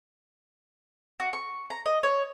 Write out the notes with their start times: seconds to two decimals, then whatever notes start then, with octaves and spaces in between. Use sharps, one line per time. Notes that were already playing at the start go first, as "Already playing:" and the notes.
1.20 F#4
1.33 C#6
1.70 A#5
1.86 D#5
2.03 C#5